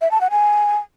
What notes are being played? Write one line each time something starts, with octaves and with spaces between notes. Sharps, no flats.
E5
A5
F#5
G#5